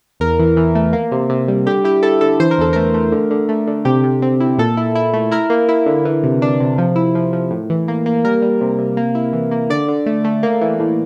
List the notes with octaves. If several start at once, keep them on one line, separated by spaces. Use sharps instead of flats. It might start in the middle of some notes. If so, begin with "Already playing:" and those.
E2 A#4
E3
E3
A3
A#3
C3
C3
G3
D3 G4
E4 G4
E4 A4
D3 A4
E3 C5
A#4
E2 A4
A3 A#4
A3
D3
D3
A3
D3
C3 G4
C3
C4
E4
A#2 A4
E4
E4
A3
E4 A#4
A#3
E4
D3
E3
C3
D4
C3
F3
E4
F3
F3
A2
E3
A#3
A#3
G3 A#4
G3
C3
C3
A#3
E4
E3
A#3
D3 D5
D3
A3
A3
A#3
E3
A2